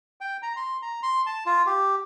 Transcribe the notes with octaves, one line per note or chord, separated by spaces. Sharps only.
G5
A#5
C6
A#5
C6
A5
F4
G4